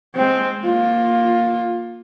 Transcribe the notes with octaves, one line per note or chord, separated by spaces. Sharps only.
G#3 C4
A#3 F4